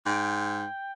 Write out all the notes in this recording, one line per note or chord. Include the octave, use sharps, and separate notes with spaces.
G#2 G5